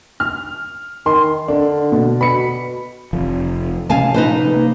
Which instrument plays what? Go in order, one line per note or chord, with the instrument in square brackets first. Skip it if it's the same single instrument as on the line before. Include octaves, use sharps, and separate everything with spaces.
[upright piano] F6
[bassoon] D#3 [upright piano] C6
[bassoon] D3 [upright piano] D4
[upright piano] B2
[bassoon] B2 [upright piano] B5 C#7
[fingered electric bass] F1 F3
[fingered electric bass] C3 F3 C#4 [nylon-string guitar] F5 G#5 A5
[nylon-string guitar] D#4 B4 C5
[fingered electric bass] A#3